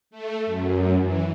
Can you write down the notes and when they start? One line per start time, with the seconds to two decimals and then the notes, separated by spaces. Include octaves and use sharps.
0.11 A3
0.46 F#2
1.01 E3